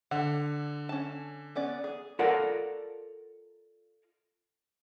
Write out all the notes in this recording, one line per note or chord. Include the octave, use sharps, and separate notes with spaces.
D3 F#5
C#4 A5
B3 C#4 D5
G#4
F4 A4 A#4 C#5 D5 F#5